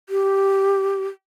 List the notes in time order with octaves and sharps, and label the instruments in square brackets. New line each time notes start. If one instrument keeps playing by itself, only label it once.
[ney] G4